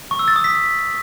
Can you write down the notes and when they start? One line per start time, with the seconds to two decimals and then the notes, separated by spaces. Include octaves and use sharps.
0.11 C#6
0.19 E6
0.28 A6
0.36 D#6
0.44 B6